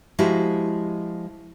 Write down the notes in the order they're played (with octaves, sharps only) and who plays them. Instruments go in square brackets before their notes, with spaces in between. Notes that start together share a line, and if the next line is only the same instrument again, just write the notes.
[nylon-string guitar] F3 G#3 E4 F#4 G4